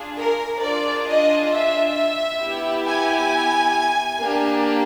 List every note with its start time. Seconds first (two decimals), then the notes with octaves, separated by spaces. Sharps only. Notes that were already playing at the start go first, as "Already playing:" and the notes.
Already playing: D4 F4 G#4
0.18 A#4
0.63 D4 F4 G#4 D5
1.08 D#5
1.52 E5
2.42 B3 E4 G4
2.86 G#5
4.20 A#3 D4 G4